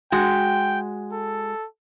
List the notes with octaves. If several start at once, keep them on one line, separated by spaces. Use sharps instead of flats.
G#3 F#4 G5
A4